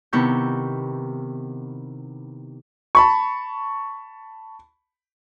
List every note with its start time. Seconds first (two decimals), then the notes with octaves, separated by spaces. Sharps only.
0.13 C3 D#3 B3 E4 C#6 G6
2.95 A5 B5 C#6